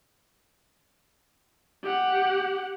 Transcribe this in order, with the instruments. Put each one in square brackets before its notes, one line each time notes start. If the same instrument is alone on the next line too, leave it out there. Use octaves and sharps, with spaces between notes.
[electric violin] G4 F#5